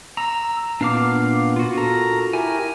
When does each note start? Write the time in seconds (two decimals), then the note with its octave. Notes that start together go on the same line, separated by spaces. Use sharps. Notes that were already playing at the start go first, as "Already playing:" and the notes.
0.17 A#5 E6
0.81 A#2 B3 D4 F5 D6
1.56 F4 F#4
1.78 A4 A#4 A#5
2.33 E4 G4 A#4 G#5